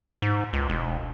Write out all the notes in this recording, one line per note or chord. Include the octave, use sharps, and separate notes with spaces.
G#2
C#2
E1